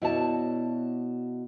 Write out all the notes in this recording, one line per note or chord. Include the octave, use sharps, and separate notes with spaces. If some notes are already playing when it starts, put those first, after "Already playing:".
B2 E4 F#4 C#5 D5 A5